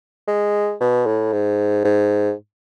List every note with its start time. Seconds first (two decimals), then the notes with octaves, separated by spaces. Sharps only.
0.27 G#3
0.80 B2
1.06 A2
1.33 G#2
1.84 G#2